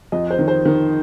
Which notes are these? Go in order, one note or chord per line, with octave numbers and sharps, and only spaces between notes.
F2 D#5
C5
D#3
C5
D#3